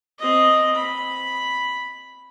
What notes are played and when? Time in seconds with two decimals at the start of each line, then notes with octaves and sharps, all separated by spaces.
0.19 C4 D#5
0.75 B5